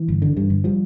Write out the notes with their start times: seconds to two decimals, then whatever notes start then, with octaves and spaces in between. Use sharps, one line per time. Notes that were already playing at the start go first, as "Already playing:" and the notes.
Already playing: E3
0.08 G1
0.22 D3
0.37 G2
0.50 G1
0.64 F3 G3